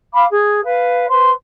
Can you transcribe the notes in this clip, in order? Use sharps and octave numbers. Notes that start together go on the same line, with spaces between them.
F5 B5 D6
G#4
B4 F5
B4 C5 C6